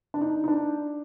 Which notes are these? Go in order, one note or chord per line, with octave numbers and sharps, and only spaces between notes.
D4
D#4
D#4
D4